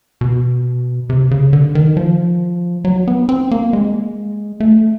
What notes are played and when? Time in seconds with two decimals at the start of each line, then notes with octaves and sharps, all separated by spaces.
0.21 B2
1.10 C3
1.31 C#3
1.53 D3
1.75 D#3
1.97 F3
2.85 F#3
3.08 B3
3.29 C4
3.51 A#3
3.73 G#3
4.60 A3